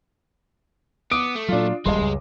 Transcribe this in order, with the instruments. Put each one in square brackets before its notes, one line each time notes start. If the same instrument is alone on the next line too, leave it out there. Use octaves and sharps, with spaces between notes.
[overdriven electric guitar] B3 [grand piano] D6 D#6 D7
[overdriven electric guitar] A3
[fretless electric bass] A#2 F#3 [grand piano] D4 F4
[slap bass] D#1 A#1 [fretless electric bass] G3 [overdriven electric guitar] G#3 [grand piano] D#5 C6
[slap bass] C#2 F#2